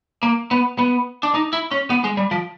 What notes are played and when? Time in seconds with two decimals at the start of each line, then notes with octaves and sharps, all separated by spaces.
0.23 A#3
0.51 B3
0.79 B3
1.23 D4
1.34 D#4
1.53 E4
1.71 C#4
1.90 B3
2.04 G#3
2.17 G3
2.31 F3